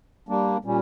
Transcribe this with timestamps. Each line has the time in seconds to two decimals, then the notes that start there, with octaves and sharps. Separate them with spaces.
0.29 G3 A#3 D4
0.65 A#2 G3 C#4